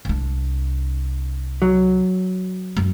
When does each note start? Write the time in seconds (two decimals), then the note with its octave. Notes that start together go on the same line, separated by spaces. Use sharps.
0.05 C2 D4
1.62 F#3
2.77 F#2